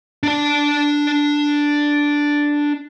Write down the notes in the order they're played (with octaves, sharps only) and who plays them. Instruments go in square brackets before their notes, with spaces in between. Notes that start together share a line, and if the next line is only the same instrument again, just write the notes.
[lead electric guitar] D4 A5